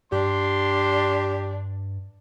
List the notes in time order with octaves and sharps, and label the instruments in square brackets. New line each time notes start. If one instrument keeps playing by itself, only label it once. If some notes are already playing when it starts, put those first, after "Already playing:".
[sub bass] G2 [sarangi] D4 [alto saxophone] G4 [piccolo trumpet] C6